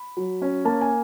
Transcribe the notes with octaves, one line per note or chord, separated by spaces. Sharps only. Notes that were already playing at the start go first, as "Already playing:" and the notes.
Already playing: B5
F#3
C#4
A#3 A5
G#5